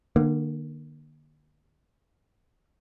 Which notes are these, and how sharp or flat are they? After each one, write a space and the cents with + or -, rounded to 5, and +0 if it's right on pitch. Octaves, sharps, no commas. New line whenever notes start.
D3 +45 A#3 +15